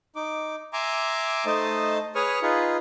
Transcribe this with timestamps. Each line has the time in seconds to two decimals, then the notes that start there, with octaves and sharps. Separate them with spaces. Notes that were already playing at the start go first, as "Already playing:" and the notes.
0.16 D#4 D6
0.73 E5 G#5 A#5 C6 D6
1.46 A3 D#4 C5 D#5 A5
2.15 G#4 B4 C#5 C#6 D#6 F6
2.42 D#4 F4 G#4 B4